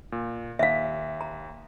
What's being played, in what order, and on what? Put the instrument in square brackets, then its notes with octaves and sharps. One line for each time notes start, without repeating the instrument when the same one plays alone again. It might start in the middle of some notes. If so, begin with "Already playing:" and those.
[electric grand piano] A#2
[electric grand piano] D#2 [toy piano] E5 F5
[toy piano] A#5